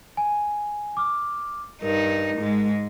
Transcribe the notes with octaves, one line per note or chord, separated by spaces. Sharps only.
G#5
D6 F6
G2 D#4 A#4
G#2 G#3